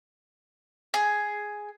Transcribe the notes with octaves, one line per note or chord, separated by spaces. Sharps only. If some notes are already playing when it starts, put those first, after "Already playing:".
G#4